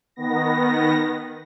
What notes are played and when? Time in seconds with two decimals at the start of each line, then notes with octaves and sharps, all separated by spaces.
0.16 D#3 B3 A#6